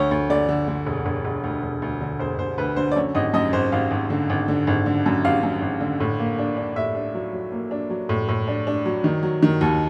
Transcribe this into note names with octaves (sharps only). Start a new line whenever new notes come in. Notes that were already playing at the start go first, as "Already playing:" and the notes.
Already playing: D2 C#5
D2
D3 D5
D3
D3
E1
E1
E1
D2
E1
D2
D3
E1 C5
E1 C5
D2 B4
D3 C5
D5
F#2 C#5
G#1 D#5
F#2 D#5
G#1 C5
G#1 F5
G#1
D3
G#1
D3
G#1
D3
F#2
G#1 F5
F#2
G#1
D3
A2
A#3
D4
D4
A2 E5
D4
F#3
F#3
A#3
D4
F#3
A2
A2
D4
D4
F#3
D#3
F#3
D#3
D#2